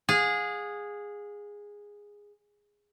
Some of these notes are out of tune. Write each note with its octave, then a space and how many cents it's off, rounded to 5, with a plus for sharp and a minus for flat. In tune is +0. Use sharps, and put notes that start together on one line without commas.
G#4 -10 F5 +45